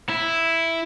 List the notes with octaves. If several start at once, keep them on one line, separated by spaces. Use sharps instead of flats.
E4